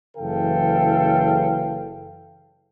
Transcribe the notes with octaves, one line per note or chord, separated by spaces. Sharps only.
F#1 C#3 E3 A4 F5 G5